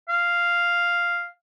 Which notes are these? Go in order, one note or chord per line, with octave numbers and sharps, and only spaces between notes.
F5